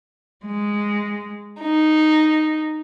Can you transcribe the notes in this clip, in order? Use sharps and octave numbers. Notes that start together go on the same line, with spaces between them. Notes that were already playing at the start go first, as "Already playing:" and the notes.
G#3
D#4